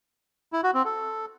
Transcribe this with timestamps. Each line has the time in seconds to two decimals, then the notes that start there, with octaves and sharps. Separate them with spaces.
0.53 E4
0.64 F#4
0.74 C4
0.85 A4